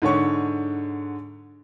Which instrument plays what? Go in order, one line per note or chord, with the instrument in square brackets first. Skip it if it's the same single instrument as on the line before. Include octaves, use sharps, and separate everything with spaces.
[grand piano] G#2 D3 C#5 C#6